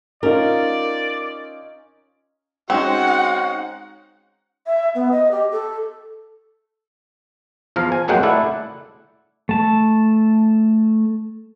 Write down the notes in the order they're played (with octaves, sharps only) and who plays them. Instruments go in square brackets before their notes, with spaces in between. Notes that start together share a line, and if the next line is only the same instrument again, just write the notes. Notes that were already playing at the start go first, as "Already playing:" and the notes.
[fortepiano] C#4 D#4 F4 [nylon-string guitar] A#4 [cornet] D5
[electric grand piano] G#3 C#4 D#4 [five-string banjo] C4 [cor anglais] F#4 [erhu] F#5
[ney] E5
B3
D#5
G4
A4
[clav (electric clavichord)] E2 F3 F5 A#5
G#5
F2 F#3 G#3 A#3 F#5 G5
A3 E4 D5 F#5
[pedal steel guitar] A3 A5